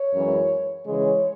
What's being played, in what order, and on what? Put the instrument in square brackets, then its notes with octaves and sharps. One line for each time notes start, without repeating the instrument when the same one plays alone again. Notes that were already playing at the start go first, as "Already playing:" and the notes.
Already playing: [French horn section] C#5
F#2 E3 G#3 C#4
C#3 E3 G#3 C#5